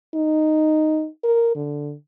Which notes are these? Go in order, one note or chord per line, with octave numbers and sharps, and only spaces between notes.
D#4
A#4
D3